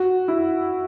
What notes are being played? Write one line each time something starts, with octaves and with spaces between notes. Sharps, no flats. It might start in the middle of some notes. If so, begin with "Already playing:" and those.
Already playing: F#4
E4